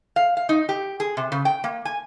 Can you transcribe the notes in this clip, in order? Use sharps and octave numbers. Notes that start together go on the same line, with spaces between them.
F5
F5
D#4
G4
G#4
C3
C#3
G5
A#3
G#5